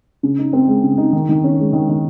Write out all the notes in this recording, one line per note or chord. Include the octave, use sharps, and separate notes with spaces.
C#3
D#4
C4
G#3
C#3
D#4
D#3
D#3
C#4
G#3
D#3
D#3